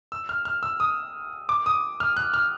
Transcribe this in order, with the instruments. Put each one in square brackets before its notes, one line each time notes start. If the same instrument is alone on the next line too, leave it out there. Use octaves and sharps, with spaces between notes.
[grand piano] E6
F6
F6
E6
D#6
D6
D#6
F6
F#6
F6